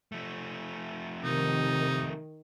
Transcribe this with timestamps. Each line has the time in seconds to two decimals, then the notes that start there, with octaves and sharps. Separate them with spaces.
0.12 F3 A3
1.24 C3 D#3 D#4